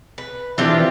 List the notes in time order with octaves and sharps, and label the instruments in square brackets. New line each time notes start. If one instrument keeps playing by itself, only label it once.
[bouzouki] B4
[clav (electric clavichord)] E3 D4 [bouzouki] C4 F4 G4 [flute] E5